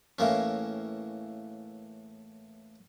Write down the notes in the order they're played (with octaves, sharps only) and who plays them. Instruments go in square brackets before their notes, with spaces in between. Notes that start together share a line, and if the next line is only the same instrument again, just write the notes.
[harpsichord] A2 E3 A#3 C#4